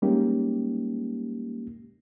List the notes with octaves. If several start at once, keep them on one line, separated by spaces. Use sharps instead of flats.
G3 G#3 A#3 C#4 D#4 G4